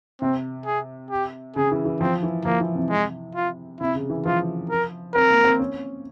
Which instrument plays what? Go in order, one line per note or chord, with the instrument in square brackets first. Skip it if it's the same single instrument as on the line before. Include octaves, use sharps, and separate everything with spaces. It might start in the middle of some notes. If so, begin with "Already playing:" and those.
[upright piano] C3 [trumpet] C4
[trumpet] G#4
G4
[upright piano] C#3 [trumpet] G#4
[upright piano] E3
E3
[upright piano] F3 [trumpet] C4
[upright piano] E3
[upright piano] F3 [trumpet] A#3
[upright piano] E3
C3
[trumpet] G#3
F4
[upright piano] C3 [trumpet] E4
[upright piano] C#3
E3
[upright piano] F3 [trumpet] F4
[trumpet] A#4
[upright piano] C4 [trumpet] A#4
[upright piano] A#3
C4
C#4